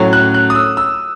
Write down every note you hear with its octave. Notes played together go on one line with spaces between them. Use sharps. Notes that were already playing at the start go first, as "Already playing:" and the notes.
Already playing: A2 F#3 C#4
F#6
F#6
D#6
E6
E6